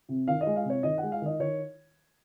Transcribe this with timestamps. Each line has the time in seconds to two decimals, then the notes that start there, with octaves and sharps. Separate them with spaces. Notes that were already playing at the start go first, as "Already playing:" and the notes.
0.09 C3
0.28 D#3 F5
0.41 D#5
0.47 G#3
0.56 F5
0.65 C3 C#5
0.83 D#3 D#5
0.98 F#5
1.03 G#3
1.12 F5
1.22 D#3 D#5
1.40 D#3 C#5